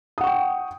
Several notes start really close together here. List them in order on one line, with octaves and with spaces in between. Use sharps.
D#6 F#5 C#6 G5